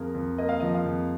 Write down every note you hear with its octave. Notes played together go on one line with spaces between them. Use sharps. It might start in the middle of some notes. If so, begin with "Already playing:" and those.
Already playing: F2 A#3 G#4 A#4
F2
A#3 D#5
F5
F3 D#5
F5
F2